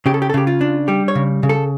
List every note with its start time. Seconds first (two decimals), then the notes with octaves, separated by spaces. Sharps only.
0.06 C#3 G4
0.14 A4
0.22 G4
0.30 A4
0.34 C#3 G4
0.47 F4
0.61 D4
0.88 G3 G4
1.08 C#5
1.15 C#3
1.43 C#3
1.49 A4